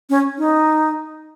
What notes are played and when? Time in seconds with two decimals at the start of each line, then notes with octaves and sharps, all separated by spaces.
0.10 C#4
0.38 D#4